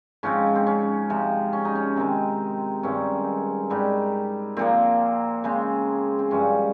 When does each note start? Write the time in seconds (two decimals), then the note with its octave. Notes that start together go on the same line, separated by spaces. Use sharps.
0.23 G#2 F3 C4 C#4
0.56 C4
0.67 C#4
1.10 C3 F3 G#3
1.53 C#4
1.65 D#4
1.75 C#4
1.96 C3 D#3 G#3 C4
2.83 G2 D#3 G#3 C4 C#4
3.70 G#2 G3 C4
4.57 A#2 F3 A#3 C4
5.44 C#3 G#3 C4
6.19 C4
6.31 G2 F3 G#3 C#4